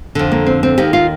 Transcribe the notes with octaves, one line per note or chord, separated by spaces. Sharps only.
F2 D3
A#3
C4
C4
D#2 D#3 G4
F4